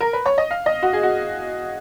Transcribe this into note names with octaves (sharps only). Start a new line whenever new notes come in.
A#4
B4
C#5
D#5
F5
D#5
F#4
G#4
F#4